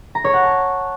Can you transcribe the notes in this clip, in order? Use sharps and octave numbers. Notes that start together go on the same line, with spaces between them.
A#5
C#5
F#5
A5